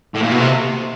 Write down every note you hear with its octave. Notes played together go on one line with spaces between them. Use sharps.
A2
A#2
B2
C3